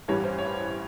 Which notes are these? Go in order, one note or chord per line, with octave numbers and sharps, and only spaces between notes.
A1 G2 E3 G3 C#5
C5
C#5